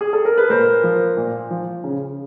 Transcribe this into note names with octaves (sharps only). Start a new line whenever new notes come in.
G#4
A4
A#4
B4
A#2 A#4 C5
F3
A#2
F3
C#3